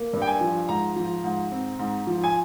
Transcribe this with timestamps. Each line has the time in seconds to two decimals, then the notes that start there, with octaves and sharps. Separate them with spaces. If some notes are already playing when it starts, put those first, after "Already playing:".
Already playing: A#3
0.13 G2
0.22 G5
0.27 G#5
0.41 F3
0.69 G#2 A#5
0.96 F3
1.24 G#2
1.52 C4
1.79 G#2
2.07 F3
2.24 G#5